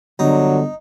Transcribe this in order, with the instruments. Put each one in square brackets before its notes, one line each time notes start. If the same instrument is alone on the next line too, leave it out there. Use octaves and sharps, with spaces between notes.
[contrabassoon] G1 [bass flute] D3 [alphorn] F#3 [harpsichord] D#4